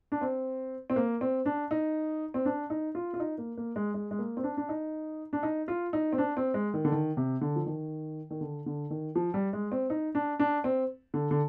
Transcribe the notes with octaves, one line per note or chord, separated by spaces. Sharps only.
D4
C4
C4
A#3
C4
D4
D#4
C4
D4
D#4
F4
F4
D#4
A#3
A#3
G#3
G#3
G#3
A#3
C4
D4
D4
D#4
D4
D#4
F4
D#4
C4
D4
C4
G#3
D#3
D3
D#3
C3
D3
F3
D#3
D#3
D3
D3
D#3
F3
G3
G#3
C4
D#4
D4
D4
C4
D3
D3